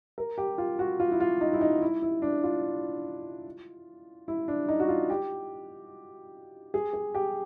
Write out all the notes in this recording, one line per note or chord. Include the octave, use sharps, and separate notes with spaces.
A#4
G4
F4
F#4
F4
E4
F4
D#4
E4
D#4
E4
E4
D4
F4
E4
D4
D#4
F#4
F4
G4
G#4
G#4
G4